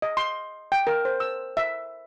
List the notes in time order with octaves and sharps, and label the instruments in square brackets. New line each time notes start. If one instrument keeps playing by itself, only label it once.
[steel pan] D#5
C6
G5
A#4
C5
E6
E5